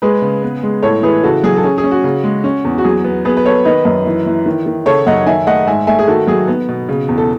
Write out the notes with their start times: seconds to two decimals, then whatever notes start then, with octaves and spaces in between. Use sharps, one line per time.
0.02 G#3 G#4 B4
0.22 C#3
0.43 B3
0.63 G#3
0.83 A2 A4 C#5
1.03 E3 G#4 B4
1.23 C#3 F#4 A4
1.44 F#3 G#4
1.56 A4
1.63 C#4 G#4
1.78 G#4
1.84 C#4
1.91 F#4
2.04 C#3
2.24 G#3
2.44 C#4
2.65 E2
2.78 F#4
2.84 F#3 G#4
3.04 B3
3.25 B3 G#4 B4
3.37 B4
3.45 B3 A4 C#5
3.65 D#3 B4 D#5
3.85 F#2
4.06 E3
4.26 E3
4.46 D#3
4.66 D#3
4.86 C#3 A4 C#5
5.07 F#2 D#5 F#5
5.26 D#3 E5 G#5
5.47 A3 D#5 F#5
5.67 G#2 E5 G#5
5.87 A3 E5 G#5
5.99 G#4
6.08 D#3 F#4 A4
6.27 F#3 G#4
6.47 B3
6.69 B2
6.89 C#3
7.08 E2
7.18 A4